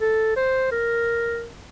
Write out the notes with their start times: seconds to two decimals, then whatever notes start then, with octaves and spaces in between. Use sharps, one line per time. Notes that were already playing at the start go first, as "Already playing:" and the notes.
0.01 A4
0.36 C5
0.72 A#4